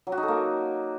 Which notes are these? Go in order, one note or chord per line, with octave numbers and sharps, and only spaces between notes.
F#3
F#4
D#4
A4
A#3